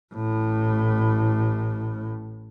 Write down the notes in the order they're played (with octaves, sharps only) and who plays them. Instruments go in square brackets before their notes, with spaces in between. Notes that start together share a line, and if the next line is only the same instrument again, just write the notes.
[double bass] A1 A2